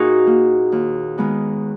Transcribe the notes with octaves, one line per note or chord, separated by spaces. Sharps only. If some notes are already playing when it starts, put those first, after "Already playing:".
Already playing: A#2 D#4 F#4 G#4
A#3
D#2
D#3 G#3 B3